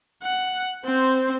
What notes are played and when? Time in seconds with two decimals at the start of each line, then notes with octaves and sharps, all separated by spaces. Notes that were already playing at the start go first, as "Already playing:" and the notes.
0.23 F#5
0.85 C4 C5